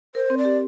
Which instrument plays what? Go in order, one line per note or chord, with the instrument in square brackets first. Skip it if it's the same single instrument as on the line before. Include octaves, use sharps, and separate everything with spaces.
[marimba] A#4 [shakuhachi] C5
[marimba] C4
[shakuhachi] D5
[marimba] G4